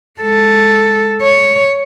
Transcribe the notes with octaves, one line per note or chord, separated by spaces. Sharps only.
G#3 A4
C#5